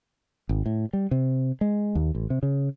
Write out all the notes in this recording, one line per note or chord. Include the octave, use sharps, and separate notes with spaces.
G#1
A2
G3
C3
G#3
D#2
A1
C3
C#3